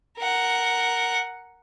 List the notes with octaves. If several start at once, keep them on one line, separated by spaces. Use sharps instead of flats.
A#4 F#5